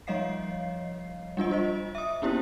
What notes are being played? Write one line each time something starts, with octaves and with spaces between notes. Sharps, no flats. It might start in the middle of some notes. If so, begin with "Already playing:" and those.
F3 G3 C#5 D#5 F5 C7
G3 D4 F4 D#5
F4 C5 D#5
E5 D#6
A#3 B3 C#4 E4 G4 C5